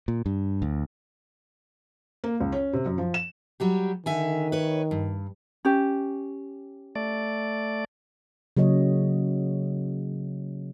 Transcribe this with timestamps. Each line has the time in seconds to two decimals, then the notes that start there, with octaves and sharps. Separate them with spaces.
0.08 A#2
0.26 G2
0.62 D2
2.24 A#3
2.40 C#2
2.52 C#4
2.73 C3
2.86 F#2
2.98 F3
3.14 E7
3.60 F#3 G3 G4
4.06 D3 D#3 E5 G#5
4.52 B4 C#5
4.91 G2
5.65 C#4 G4
6.95 A3 D5
8.57 C#3 F#3 A#3 C#5 D#5